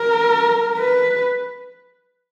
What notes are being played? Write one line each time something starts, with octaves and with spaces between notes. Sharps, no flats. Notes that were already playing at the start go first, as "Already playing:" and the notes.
Already playing: A#4
B4